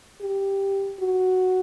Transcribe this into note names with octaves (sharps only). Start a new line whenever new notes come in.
G4
F#4